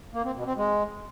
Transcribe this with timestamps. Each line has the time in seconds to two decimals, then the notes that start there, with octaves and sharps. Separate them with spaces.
0.13 A#3
0.24 C4
0.35 B2
0.46 C4
0.56 G#3